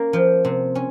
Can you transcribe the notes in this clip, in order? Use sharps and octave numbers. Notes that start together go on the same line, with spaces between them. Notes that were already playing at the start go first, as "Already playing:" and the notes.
Already playing: A#3 C#4
F3
C3
C#4